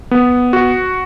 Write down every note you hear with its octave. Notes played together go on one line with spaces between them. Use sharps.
B3
F#4